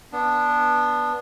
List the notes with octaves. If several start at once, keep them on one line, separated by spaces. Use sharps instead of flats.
B3 D4